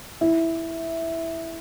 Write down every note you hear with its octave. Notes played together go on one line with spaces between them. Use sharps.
E4